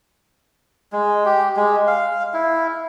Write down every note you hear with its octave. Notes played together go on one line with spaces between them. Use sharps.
G#3
G4
G#3
F5
E4